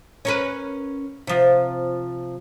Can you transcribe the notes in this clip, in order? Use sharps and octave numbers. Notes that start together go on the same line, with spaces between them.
C#4 A#4 B4
C3 F3